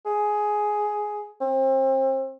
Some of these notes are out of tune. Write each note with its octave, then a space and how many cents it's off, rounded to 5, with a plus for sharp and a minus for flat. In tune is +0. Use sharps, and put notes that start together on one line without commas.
G#4 +10
C4 +30